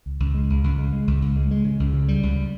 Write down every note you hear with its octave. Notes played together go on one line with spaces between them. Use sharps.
C#2
C#2
G#3
C#2
C#2
G#3
G#3
C#2
C#2
G#3
G#3
C#3
C#2
C#3
G3
C#2